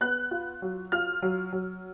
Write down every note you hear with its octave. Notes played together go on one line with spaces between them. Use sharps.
B3 F#6
F4
F#3
F4 F6
F#3
F#3